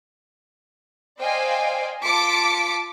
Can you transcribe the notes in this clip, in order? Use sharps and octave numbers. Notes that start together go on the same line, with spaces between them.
C5 D5 D#5 F5 G5 G#5
F4 A5 D6 B6 C#7 D7